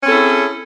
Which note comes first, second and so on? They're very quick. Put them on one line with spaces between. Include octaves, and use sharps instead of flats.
C#4 C4 A4 E4 G#4